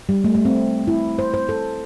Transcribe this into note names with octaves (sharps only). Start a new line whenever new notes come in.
G3
A3
A3
C4
E4
C5
C5
A4